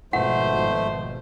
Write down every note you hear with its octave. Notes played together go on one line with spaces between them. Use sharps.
G#1 B2 F3 A3 C5 F#5